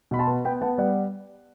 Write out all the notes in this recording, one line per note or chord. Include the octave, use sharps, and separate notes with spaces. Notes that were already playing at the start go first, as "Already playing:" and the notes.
B2 B5
A5 C6
B3
B3 G5 B5
B3 F#5 A5
G3 D5 F#5